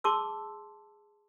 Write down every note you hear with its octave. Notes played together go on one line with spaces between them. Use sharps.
G#4 A5 C6 D6 E6